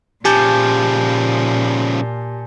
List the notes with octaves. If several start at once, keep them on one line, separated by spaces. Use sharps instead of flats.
A#2 C#3 F3 G4 G#5 A5 G6